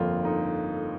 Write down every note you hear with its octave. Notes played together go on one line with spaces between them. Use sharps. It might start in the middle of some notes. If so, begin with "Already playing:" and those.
Already playing: G1 F2 D3 F3 A#3 F4
D#4